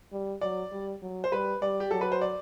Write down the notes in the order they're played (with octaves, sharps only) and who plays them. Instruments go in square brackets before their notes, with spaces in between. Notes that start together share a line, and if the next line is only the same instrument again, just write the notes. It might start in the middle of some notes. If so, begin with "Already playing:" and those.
[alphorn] G3
[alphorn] F#3 [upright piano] D5
[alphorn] G3
F#3
[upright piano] C5
[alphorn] G3 [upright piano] B4
[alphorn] G3 [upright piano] D5
[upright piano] G4
[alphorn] F#3 [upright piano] A4
[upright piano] B4
C5
D5